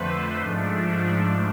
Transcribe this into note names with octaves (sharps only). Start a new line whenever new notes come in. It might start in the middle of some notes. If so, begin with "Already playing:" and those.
Already playing: F2 D3 A3 B4 C5
G#2 F3 A3 D4